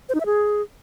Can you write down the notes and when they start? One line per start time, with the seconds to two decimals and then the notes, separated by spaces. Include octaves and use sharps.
0.09 C5
0.15 D#4
0.20 E5
0.26 G#4